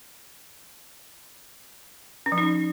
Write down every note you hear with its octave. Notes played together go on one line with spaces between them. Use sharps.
C#4
F3
D#4